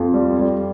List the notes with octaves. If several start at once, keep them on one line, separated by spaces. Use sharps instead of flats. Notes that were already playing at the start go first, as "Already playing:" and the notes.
Already playing: F2 F4
G3
G3